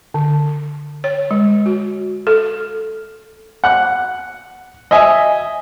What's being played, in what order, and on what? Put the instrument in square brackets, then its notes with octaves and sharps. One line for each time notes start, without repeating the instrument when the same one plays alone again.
[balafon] D3
C#5
G#3
F#4
A4
[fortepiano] F#5 F#6
D#5 E5 G#5